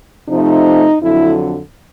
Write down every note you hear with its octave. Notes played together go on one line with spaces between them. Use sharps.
C3 F3 A3 D#4
F2 D3 F#3 E4